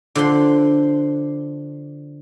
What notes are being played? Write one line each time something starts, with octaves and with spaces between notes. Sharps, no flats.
D3 F3 A4 F#5 C6